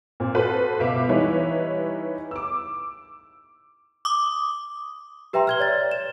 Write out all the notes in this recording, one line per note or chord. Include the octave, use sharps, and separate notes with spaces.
A#2 C4
F#4 A4 B4 C5
C#2 B2 E5 F5 D6
E3 G3 D#4 E4 B4 C#5
D6 E6
D6 D#6
G4 B4 E5 G5 A#5 C6
F6 G#6 G7
C#5 D5 A6
E7